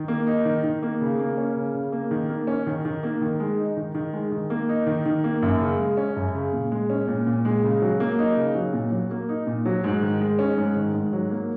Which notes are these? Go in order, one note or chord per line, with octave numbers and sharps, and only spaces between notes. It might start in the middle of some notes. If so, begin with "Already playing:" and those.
Already playing: D#3
A#3
D#4
D#3
D#3
A#3
C#3
A#3
C#4
C#3
C#3
A#3
D#3
A#3
C#4
D#3
D#3
A#3
D#3
G#3
D#4
D#3
D#3
G#3
D#3
A#3
D#4
D#3
D#3
A#3
F#2
C#3
G#3
C#4
F#2
C#3
A#2
G#3
C#4
A#2
A#2
G#3
C#3
F#3
A#3
D#4
C#3
F#3
A#2
F#3
A#3
D#4
A#2
F#3
G#2
D#3
G#3
C#4
G#2
D#3
G#2
F#3
A#3